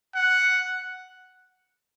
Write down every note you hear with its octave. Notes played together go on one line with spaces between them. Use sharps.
F#5